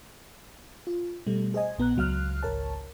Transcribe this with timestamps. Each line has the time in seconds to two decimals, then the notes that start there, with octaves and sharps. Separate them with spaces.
0.87 F4
1.27 B2 G3 A3
1.54 G#4 C5 D#5 G#5
1.78 A#1 B3 A#5 F#6
1.97 C#2 F#3 F5 F6 F#6
2.43 G#1 C#2 A#4 C#5 A5